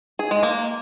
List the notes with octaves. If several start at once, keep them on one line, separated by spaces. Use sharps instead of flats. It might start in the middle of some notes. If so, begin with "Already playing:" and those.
G#4
G#3
A#3